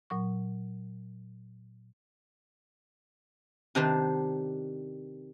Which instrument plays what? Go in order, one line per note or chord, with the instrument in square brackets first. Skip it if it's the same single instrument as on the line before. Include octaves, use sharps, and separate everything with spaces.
[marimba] A#2 F#3 C#6
[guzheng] C3 D#3 D4 D#4 B4 C5